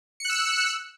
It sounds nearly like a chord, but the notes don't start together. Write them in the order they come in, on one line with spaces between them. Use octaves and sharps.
C#7 F#6 E6